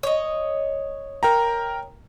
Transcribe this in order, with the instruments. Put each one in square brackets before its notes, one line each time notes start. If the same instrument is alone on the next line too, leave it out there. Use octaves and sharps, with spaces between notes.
[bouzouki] C#5 D#5
[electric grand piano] A#4 G5 A#5